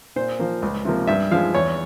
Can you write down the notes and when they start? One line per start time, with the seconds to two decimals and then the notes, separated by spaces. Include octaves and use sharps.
0.16 A#2 C5
0.39 F3 A#3
0.62 C#2
0.85 C3 F3 A#3
1.07 G2 E5
1.31 F3 G#3 F5
1.54 E2 C#5